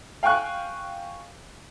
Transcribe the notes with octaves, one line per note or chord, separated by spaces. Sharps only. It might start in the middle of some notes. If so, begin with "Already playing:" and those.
F5 G5 G#5 C#6 F#6